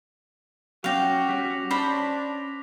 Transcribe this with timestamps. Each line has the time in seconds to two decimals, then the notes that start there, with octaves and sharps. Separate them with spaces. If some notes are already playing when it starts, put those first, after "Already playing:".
0.84 F#3 C#4 F#4 F5 G5 D6 A#6 F7
1.29 G3 C#4 B6
1.71 C#4 D4 C5 B5 C#6